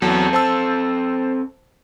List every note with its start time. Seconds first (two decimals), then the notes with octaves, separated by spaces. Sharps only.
0.02 E2 F#3 C4 A4
0.33 C5 A5 E6